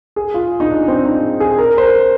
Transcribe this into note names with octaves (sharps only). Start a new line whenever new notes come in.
G#4
F4
D#4
D4
C4
D#4
G#4
A#4
C5
A#4